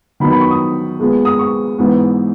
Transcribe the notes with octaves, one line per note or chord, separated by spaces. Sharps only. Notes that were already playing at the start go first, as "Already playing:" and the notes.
D#3 F#3 B3 D#4 B5
B5
C#6
D#6
A#2 G#3 B3
D#6
C#6
G#2 E3 B3